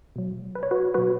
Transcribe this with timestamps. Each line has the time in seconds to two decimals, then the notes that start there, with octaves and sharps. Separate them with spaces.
0.16 B2 F#3
0.55 B4
0.63 C#5
0.71 F#4 B4
0.94 B2 F#3 F#4 B4